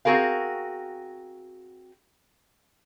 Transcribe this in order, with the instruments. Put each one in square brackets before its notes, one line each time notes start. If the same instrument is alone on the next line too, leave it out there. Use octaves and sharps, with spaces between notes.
[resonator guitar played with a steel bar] C4 F#4 G#4 A#4 F5